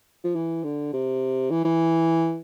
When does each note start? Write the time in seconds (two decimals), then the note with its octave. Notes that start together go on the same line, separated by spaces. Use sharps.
0.24 F3
0.35 E3
0.64 D3
0.93 C3
1.51 E3
1.65 E3